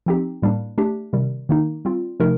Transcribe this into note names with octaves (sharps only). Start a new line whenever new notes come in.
F3 C4 D#4 G4
A2 G3 A#3 D4
A3 D4 G4
C3 D#3 G3
D#3 A#3 D#4
G3 C4 F4
C3 F3 A3 D#4 A#4